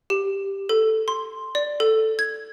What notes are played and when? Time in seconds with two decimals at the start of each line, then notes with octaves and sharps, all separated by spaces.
0.10 G4
0.69 A4
1.08 C6
1.55 D5
1.80 A4
2.19 G#6